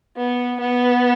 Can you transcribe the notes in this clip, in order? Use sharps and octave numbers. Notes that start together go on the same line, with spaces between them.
B3
B3